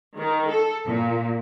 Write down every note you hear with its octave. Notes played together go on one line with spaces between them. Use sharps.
D#3
A4
A#2